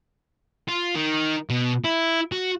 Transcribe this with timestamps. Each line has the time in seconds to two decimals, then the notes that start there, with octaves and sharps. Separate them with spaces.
0.69 F4
0.96 D#3
1.50 B2
1.84 E4
2.32 F#4